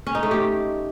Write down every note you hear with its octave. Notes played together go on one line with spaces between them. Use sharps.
C#4
D#4
A3
G4